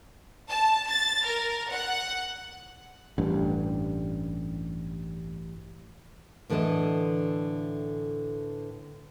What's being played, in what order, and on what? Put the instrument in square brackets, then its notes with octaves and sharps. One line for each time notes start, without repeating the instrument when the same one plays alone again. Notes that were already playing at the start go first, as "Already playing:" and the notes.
[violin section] A5
A6
A#4
F#5
[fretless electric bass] A1 G2
[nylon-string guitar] A2 D3 E3 D4 A4 D#5